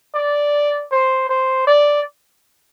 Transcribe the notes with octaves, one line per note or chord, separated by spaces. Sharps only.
D5
C5
C5
D5